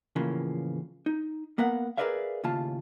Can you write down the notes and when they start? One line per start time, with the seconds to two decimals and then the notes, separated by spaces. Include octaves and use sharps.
0.16 A2 C#3 E3 F3 A#3
1.06 D#4
1.58 A#3 B3 A#4 F5 F#5
1.97 G#4 A#4 B4 D5 E5 F5
2.44 D#2 A2 C#3 F4 A5